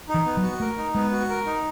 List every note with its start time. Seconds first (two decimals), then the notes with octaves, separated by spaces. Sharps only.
0.09 D#4
0.14 E3
0.26 B3
0.37 F#3
0.43 F#4
0.60 A3 A#4
0.77 D#4
0.95 G#3 B3
1.12 F#4
1.29 A#4
1.46 D#4